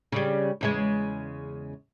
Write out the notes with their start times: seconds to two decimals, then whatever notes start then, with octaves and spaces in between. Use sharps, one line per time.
0.12 C#3 G3
0.61 E2 C#3 G#3